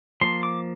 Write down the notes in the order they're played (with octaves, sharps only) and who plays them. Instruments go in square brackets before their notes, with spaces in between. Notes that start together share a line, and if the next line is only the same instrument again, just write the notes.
[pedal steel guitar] F3 A#3 C6
D6